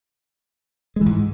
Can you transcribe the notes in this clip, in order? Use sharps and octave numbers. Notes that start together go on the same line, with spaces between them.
G#2 E3 G#3